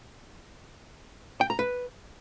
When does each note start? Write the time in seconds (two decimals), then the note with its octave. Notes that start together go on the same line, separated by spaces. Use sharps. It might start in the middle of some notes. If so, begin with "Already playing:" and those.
1.41 G5
1.50 A#5
1.59 B4